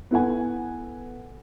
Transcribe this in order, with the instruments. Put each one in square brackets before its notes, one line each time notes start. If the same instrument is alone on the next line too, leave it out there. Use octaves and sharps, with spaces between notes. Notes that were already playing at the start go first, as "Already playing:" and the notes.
[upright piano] B3 E4 A4 F#5 G#5